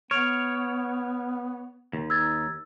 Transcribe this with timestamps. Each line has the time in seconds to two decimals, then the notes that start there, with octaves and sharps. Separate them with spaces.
0.11 B3 C#5 F6 D7 F7
1.93 D#2
2.10 D#4 E6 G#6 A6